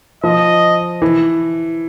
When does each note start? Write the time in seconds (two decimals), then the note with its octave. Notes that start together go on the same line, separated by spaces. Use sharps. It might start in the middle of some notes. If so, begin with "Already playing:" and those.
0.24 F3 D#5
1.02 E3